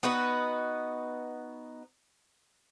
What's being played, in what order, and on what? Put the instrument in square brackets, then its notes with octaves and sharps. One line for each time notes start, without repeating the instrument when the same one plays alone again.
[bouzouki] B3 D#4 F#4 B4